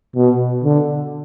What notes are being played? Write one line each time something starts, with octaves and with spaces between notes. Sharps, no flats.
B2
D3